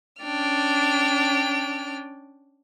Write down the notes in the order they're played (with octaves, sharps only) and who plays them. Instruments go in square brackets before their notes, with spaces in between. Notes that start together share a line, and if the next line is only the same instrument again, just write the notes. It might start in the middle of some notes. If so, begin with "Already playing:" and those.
[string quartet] C#4 D4 G5 F6